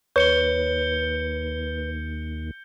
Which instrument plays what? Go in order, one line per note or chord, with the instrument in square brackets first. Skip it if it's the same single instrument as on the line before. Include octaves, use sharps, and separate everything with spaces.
[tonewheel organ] D#2 [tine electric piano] B4 [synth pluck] C#5 [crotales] G6 C#7 G7